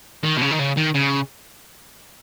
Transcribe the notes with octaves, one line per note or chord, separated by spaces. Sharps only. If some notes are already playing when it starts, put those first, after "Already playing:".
D#3
B2
C#3
D#3
C#3
D#3
C#3